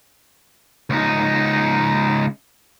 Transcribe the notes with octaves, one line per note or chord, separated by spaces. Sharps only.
C#2 D#4